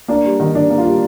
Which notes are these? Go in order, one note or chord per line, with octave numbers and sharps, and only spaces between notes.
A#3 D4
G3
D#3
D#3 D4
A#3
F4
G3